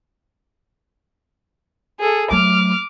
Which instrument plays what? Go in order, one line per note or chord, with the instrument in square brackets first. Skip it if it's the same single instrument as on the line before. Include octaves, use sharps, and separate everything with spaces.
[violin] G#4 A4
[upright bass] F#3 A3 [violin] D6 F6